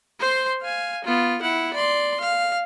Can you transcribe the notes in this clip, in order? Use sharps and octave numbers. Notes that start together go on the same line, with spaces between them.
C5 C6
F5 G#5
B3 F4
E4 F#5
D5 C6
F5